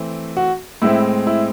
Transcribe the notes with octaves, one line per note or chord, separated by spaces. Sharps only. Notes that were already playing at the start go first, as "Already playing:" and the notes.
Already playing: E3 A3 C4
F#4
A2 G#3 C4 E4
E4